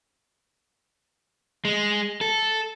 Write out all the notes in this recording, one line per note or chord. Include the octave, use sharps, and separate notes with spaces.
G#3
A4